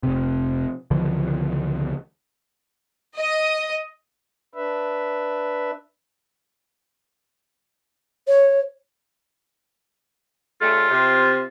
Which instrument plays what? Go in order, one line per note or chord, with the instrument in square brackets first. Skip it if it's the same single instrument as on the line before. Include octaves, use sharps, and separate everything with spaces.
[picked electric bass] F1 C3
C#2 D3 E3 F3
[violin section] D#5
[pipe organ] D4 B4 E5
[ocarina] C#5
[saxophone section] C#3 G3 A3 [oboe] F4
[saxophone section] C3